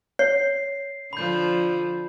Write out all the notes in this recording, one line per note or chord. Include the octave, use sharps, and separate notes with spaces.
C#5 C7
D3 F3 B5 G6